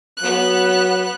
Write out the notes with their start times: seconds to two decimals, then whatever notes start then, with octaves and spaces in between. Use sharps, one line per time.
0.22 F#3 B3 F#6